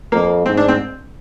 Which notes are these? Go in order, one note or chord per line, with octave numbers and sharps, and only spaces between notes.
F2 A#3
G#2 C4
D4
C4